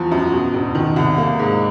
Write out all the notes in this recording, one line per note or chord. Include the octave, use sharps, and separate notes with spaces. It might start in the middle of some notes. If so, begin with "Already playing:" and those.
Already playing: E2 F3
F#2
B2
E1
D#3
C2
A#3
G#2